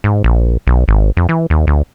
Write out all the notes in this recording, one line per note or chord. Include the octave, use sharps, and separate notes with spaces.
G#2
A#1
B1
G#1
F2
E3
D#2
D2